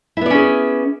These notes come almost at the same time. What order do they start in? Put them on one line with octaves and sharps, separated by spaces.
E4 B3 D5 C#4 G#4